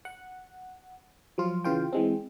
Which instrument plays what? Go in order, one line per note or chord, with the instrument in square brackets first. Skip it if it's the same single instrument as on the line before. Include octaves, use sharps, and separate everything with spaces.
[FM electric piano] F#5
F3 F#3 F4
C#3 E3 F4 G5
E3 G#3 C4